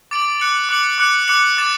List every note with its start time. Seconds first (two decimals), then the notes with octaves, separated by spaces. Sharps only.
0.11 D6 A6 D7 F#7
0.40 D6 F#6 C#7 F#7
0.69 D6 F#6 C#7 F#7
0.98 D6 F#6 C#7 F#7
1.28 D6 F#6 C#7 F#7
1.57 D6 A6 E7